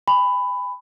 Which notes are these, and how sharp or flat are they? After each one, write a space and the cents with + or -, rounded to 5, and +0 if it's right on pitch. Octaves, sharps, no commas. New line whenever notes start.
G#5 -30 B5 +15